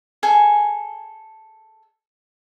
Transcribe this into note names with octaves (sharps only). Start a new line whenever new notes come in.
G#4 A4 G#5